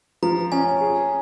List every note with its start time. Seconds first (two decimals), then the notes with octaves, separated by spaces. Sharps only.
0.23 F3 A#5
0.52 C#4 G#5
0.81 G#4